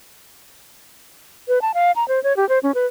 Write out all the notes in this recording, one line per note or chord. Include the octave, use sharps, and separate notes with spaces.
B4
A5
F5
A#5
C5
C#5
G4
C5
C#4
B4